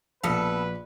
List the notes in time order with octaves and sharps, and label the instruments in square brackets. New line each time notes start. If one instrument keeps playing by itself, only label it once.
[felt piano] A#1 C#7 [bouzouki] B2 A4 [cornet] B4